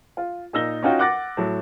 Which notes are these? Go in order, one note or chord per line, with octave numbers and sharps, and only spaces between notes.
F4
A#2 D#4 E6 A#6 G7
C#4 D#4 F4 F#4 G5
F#5 D6 F#6 A6 A#6
A2 F#3